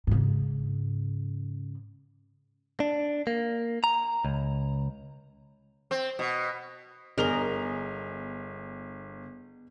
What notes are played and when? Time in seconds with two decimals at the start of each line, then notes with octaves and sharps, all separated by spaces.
0.07 G#2 C#3
2.80 D4
3.27 A#3
3.84 A#5
4.25 C#2
5.91 C4
6.19 B2
7.18 G1 B3 D4 G#4 A#4 D#5 F7 G7